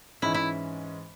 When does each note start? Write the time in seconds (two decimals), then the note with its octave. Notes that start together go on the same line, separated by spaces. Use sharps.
0.22 G#2 E3 G#3 C#4 E4
0.34 E4